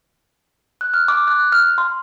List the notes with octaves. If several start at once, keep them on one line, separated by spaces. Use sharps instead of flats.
F#6
F6
D6
F#6
F6
C6